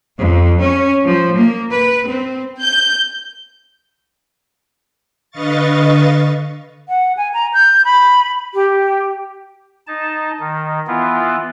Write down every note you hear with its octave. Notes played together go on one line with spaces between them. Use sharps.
F2
C#4
F3
A#3
B4
C4
G6
D3 B4 D#5 F5 C#6 A6
F#5
G#5
A#5
G6
B5
G4
D#4 A5
D#3
E3 B3 E4 F4